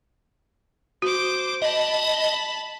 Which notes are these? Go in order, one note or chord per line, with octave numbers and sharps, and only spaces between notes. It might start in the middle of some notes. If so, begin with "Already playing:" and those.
F#4 C5 D6
D#5 A5 B5